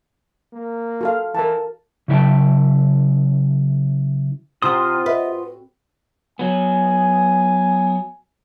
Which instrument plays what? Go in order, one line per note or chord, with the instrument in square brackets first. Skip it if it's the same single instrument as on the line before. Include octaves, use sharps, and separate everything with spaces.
[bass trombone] A#3
[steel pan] F#4 A4 F5
[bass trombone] E3 [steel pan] A#4 A5
[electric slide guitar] C#3 F#3 E4 C#5 G5 A5
[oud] C3 [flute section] E4 F6 [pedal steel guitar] F4 C6 D#6 [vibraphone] C5 F#5
[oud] B4 [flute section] D#5 E5
[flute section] F#4
[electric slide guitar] F#3 B3 [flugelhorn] G#5